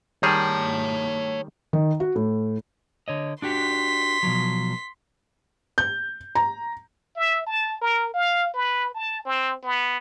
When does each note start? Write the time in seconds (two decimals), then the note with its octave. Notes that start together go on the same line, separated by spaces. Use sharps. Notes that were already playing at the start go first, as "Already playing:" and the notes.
0.23 D#3 G3 G#4 C#5 A5
1.73 D#3
2.00 F#4
2.15 A2
3.08 D3 C#5 D#5
3.42 D4 F#4 G4 C6 B6
4.23 B2 F3 F#3
5.78 G6
6.35 A#5
7.16 E5
7.47 A5
7.81 A#4
8.14 F5
8.54 B4
8.95 A5
9.25 C4
9.63 B3